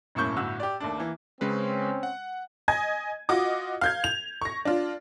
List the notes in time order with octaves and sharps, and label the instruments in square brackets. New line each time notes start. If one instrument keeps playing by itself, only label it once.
[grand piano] E1 F#2 A2 A#3 C#6 G6
G1 A2 F#4 E6
G4 D5
D#2 A3 D4
E3 A#3
[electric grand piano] C#3 G#3 B4 [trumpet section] C4 C#4
[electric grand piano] F#5
[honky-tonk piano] D#5 G#5 G#6
F4 F#4 D#5 D6
F5 G6 G#6
F7
C#6 A#6
D4 F4